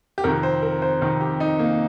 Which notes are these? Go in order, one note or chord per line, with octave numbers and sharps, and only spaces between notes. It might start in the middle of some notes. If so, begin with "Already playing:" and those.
G4
F2 C3 D#3 A#4
C5
A#4
C5
F2 C3 D#3
G4
D#4
A#3